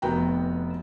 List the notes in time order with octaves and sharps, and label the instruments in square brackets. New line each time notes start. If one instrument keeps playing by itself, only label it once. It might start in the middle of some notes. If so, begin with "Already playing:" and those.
[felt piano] F1 B3 F#4 G5 A#5